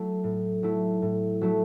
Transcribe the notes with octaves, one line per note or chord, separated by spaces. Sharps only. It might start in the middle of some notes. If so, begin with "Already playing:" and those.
Already playing: F#3 A3 E4
A2
F#3 A3 E4
A2
F#3 A3 E4